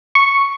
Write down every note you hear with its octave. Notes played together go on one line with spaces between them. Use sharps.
C#6